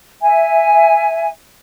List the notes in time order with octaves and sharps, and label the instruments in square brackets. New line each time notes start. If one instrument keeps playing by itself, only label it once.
[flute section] E5 G#5